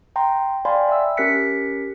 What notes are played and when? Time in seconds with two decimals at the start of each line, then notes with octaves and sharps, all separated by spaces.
0.16 G5 A#5 C6
0.65 D5 F5 G5 G#5 B5 C6
0.89 E5 E6
1.17 C#4 G4 A#4 F#6 B6 C#7